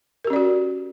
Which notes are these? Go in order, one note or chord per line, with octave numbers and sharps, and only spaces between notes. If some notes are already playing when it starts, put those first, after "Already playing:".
C#4 F#4 G4 A#4 D5